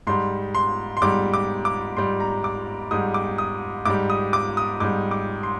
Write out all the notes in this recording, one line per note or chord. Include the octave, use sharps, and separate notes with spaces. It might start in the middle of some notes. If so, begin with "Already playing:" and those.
G#2 G3 C6
C6
C6
G#2 G3 D6
D6
D6
G#2 G3 C6
A#5
D6
G#2 G3 D#6
D6
D#6
G#2 G3 D6
D#6
D6
D#6
G#2 G3 D6
D6
C6